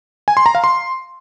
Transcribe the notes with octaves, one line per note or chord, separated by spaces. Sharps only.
G#5
C6
A#5
F5
C6